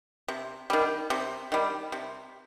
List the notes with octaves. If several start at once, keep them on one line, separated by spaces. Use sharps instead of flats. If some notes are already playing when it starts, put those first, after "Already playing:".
C3
D#3 G3
C3
D#3 G3
C3